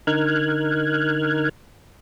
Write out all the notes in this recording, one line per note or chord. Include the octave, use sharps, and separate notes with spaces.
D3 D#4 A#4 F6 F#6 G#6